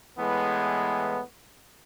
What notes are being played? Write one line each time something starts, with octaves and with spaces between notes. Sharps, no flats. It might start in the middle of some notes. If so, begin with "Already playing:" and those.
A2 E3 G#3 B3